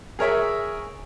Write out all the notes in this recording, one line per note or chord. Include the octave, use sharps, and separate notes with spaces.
G#4 A#4 C#5 E5